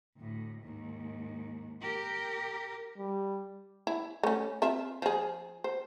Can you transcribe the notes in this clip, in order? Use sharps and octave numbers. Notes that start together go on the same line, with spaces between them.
D2 A2
D#2 G#2
G4 A#4
G3
E4
A3 C#4
C4 F4 E5
F3 G#4
C5